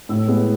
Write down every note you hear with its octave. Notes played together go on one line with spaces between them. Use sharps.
A2 E6
G#3 B3